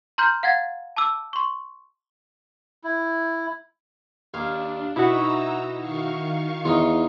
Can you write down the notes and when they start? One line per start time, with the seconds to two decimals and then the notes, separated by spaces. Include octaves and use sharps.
0.18 A#5 C6 F6 G6
0.43 F5 F#5 G#6 A6
0.96 A5 D6 E6
1.33 C6 C#6
2.84 E4
4.34 D#2 D4 F5
4.96 B2 D#4 E4 F#4 A#5 E6
5.78 D#3 F5 C#6
6.65 E2 D#4 F4